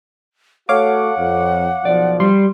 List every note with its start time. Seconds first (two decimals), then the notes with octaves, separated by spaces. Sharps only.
0.69 A3 F#4 A4 C#5 F5 F#5 D6
1.18 F2
1.85 B1 F3 D5
2.20 G3 C6